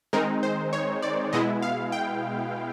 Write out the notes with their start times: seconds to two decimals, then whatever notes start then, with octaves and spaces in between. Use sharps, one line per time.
0.13 D#3 G#3 C4 D#4 A#4
0.43 C5
0.73 C#5
1.02 D5
1.33 B2 G#3 B3 E4 D#5
1.62 F5
1.92 G5